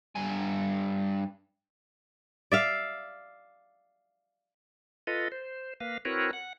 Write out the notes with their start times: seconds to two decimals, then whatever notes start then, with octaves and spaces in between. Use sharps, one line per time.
0.16 G2 G#5
2.52 D5 E5 F5
5.07 F4 A4 B4 D#5
5.32 C5
5.81 A#3 B4 F5
6.05 C4 E4 F#4 A#4 B4 C#5
6.33 F#5